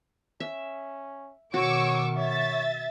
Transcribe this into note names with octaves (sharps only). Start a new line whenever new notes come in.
C#4 E5
B2 D#3 F#4 C#5 C#6 D6 E6
C#5 E5 A6